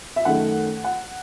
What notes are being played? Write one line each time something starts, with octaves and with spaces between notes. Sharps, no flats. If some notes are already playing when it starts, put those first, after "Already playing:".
E5
F#2 D#3 A3 F#5
F#5